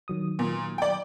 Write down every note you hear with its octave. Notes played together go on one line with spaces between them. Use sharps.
D#3 F#3 D#6
A#2
D5 G5